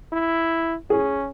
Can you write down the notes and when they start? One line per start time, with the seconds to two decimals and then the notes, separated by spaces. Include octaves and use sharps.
0.13 E4
0.90 C#4 G#4